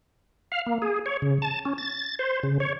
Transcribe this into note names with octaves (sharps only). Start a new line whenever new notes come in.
F5
A#3
G#4
C#5
C#3
A5
C#4
A6
C5
C#3
C#5